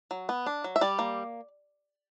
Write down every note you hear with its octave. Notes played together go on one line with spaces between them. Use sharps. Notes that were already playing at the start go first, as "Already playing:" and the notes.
F#3
B3
D4
F#3
E5
G3 D5
A#3